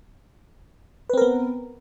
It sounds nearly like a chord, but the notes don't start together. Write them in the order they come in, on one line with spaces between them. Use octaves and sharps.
B4 C4 A#4 B3